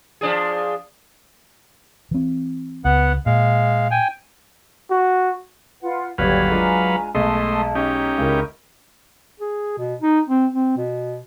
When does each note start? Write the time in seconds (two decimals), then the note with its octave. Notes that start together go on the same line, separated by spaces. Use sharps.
0.21 F3 D4 G#4
2.11 E3 C4
2.85 C#2 B3 F#5
3.26 A#2 G#3 F5
3.91 G5 G#5
4.90 F#4
5.81 F4 B4 F#5
6.18 G1 D#2 F#3 G4 B4 D5 F5 G#6
6.51 G#3 D4 F4 G#5 A#5
7.15 B1 G#3 A3 D#5 A5 C6
7.75 C#4 D#4 G4
8.18 C#2 E4 A#4
9.40 G#4
9.78 B2
10.02 D#4
10.29 C4
10.54 C4
10.77 B2